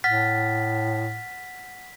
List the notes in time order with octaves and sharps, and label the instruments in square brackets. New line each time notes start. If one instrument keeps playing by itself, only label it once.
[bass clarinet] A2 [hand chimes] F#5 F6 A6 [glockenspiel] B6